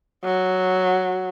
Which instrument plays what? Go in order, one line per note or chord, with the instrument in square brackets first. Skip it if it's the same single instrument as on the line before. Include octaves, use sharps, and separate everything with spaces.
[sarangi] F#3